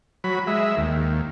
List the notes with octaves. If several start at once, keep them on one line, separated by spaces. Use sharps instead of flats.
F#3 B5
G#3 E5
D#2